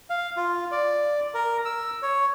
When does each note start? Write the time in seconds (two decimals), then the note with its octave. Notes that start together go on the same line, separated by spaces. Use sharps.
0.10 F5
0.37 F4
0.71 D5
1.34 A#4
1.65 E6
2.02 C#5